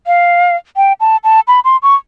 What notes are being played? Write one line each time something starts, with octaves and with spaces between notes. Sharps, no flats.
F5
G5
A5
A5
B5
C6
C#6